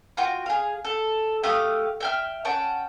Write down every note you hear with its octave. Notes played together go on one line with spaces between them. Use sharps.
F4 F#4 G5
G#4 F5
A4
A3 G4 F5 D#6
E5 G5 F6
C#4 F#5 G5 A5